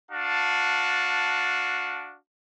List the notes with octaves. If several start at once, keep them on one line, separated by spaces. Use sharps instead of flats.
D4 F#4 F5 A5